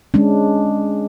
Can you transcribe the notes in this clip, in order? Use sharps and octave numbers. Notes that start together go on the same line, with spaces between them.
G#3 C#4 D4